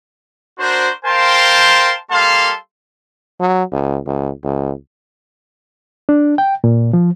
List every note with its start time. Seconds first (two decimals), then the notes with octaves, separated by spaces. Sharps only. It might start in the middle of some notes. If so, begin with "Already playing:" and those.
0.59 D4 F#4 A#4 C5
1.05 A#4 C5 F5 G5 A5 C6
2.10 G3 A#3 A4 F5 A5 C6
3.40 F#3
3.72 C#2
4.06 C#2
4.44 C#2
6.09 D4
6.38 G5
6.64 A#2
6.93 F3